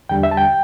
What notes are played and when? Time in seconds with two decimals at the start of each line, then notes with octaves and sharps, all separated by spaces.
0.09 E2 D3 G3 G5
0.23 E5
0.31 A5
0.37 G5